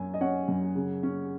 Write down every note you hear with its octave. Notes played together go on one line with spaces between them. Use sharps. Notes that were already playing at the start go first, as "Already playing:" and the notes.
Already playing: F#2 F#3 G#5
D#5
C#4 C#5 F#5
F#2
C#3
C#4